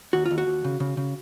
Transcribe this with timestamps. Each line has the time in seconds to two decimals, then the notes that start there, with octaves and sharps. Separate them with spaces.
0.13 D#2 F#4
0.25 F4
0.31 D#2
0.38 F#4
0.47 D#2
0.64 C#3
0.80 C#3
0.97 C#3